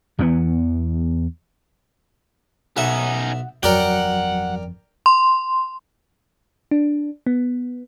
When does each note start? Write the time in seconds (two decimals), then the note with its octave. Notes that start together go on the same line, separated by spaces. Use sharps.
0.19 E2 E3 F#3 B3
2.77 B1 C#4 D#4 E5 F#5
3.63 G1 F2 F#3 A#4 D5 F#5 G5
5.06 C6
6.71 D4
7.26 B3